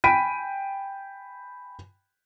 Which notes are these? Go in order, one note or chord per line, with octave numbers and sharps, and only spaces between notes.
G5 G#5 B5 B6 D7 D#7